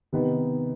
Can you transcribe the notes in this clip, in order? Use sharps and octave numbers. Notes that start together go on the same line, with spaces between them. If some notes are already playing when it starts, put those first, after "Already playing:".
C3 D#3 B3 D#4 B4